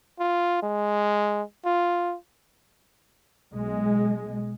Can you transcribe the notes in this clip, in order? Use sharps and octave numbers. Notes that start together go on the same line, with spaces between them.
F4
G#3
F4
B1 G#3